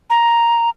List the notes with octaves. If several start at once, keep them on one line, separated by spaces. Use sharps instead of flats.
A#5